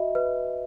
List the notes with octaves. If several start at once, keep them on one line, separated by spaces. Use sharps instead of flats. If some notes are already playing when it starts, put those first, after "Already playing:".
Already playing: F#4 D#5 E5
B4